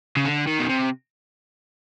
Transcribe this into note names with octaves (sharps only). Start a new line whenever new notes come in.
C#3
D3
D#3
B2
C3